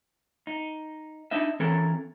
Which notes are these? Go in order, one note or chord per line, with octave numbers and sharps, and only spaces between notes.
D#4
D4 D#4 D#5 E5
E3 C4 C#4 A4 A#4